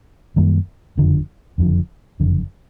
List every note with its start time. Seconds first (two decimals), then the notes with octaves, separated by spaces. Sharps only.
0.36 F#2 D#3 G3 A#3
0.97 F#1 F2 D3 F3
1.58 F#1 F2 D3 F3
2.20 F#1 F2 D3